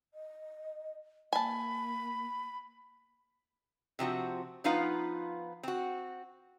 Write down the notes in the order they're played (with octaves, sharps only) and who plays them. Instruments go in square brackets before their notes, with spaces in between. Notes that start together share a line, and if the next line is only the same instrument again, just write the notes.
[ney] D#5
[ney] A#3 [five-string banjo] G#5 A5 [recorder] B5
[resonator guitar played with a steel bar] C3 F3 C4 F#4
F3 B3 D#4 F4 B4 F5
C4 F#4